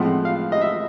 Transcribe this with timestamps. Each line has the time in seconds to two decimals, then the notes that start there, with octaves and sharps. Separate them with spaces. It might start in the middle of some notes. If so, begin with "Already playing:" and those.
Already playing: A2 F3 G#3 C4 F#5
0.25 F5
0.52 D#5
0.61 E5